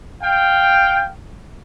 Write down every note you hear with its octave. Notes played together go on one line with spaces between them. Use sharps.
F5 G5